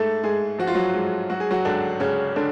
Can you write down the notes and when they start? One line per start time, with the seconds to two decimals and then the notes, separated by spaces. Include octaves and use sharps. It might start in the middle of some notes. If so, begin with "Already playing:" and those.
Already playing: G#2 A3 A4
0.23 G#2 G#3 G#4
0.59 F3 F#4
0.67 F4
0.75 F#3 F#4
0.94 G#2
1.30 F#3 F#4
1.40 G#4
1.51 F#3 F#4
1.65 C#2 D3 D4
2.00 C#2 C#3 C#4
2.36 D3 D4